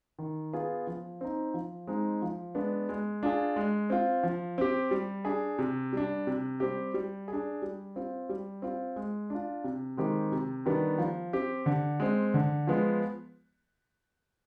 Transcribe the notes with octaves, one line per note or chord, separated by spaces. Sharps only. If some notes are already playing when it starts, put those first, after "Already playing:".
D#3
B3 F4 G#4
F3
C4 D#4
F3
G#3 C4 D#4
F3
G#3 B3 D4
G#3
D4 F4 G#4
G#3
C4 F4
F3
C4 G4
G3
D4 G#4
C3
G3 D4
C3
G3 C4 G4
G3
D4 G#4
G3
C4 F4
G3
C4 F4
G#3
D4 F4
C3
D#3 G#3 C4 G4
C3
D#3 G3 B3 D4
F3
C4 G4
D3
G#3 C4
D3
F3 G#3 B3